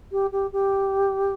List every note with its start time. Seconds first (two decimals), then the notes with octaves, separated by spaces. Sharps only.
0.12 G4
0.32 G4
0.53 G4